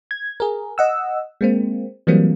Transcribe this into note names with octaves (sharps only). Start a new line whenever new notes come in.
G#6
G#4 A#4
D#5 F#5 E6
G#3 A#3 C4
E3 F#3 G3 A#3 C4